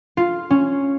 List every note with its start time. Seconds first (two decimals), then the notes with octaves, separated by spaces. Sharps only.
0.17 F4
0.51 C#4